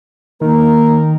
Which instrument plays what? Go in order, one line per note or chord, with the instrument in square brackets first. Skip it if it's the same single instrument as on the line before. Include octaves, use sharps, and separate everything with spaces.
[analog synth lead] D#3 [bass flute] A#3 [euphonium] A#4